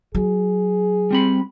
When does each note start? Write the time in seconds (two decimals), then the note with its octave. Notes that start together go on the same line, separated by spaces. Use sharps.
0.15 F#3 G#4
1.11 G3 C4 B5